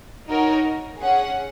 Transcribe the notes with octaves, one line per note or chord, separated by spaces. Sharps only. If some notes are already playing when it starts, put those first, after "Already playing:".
D#4 F#4 A#4 C#5
C#4 G#4 F#5